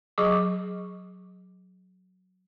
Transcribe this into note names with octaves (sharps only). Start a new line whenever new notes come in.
F#3 G#4 D#5 C#6 D6